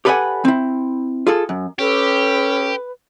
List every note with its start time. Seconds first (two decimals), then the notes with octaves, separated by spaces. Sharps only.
0.05 G4 A4 B4 D5 F#5 G#5
0.45 C4 E4
1.27 F4 G#4 A4
1.49 F#2
1.79 C#4 G4 A4 B4